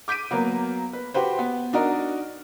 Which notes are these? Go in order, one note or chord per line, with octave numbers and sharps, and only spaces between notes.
D6 G6 B6 D7 D#7
F#3 A#3 B3
B4
F#4 G4 B4 C5
B3
D4 D#4 F#4 A#4